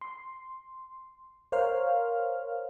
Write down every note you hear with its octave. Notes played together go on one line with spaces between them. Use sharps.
C6
A#4 C5 C#5 F5 F6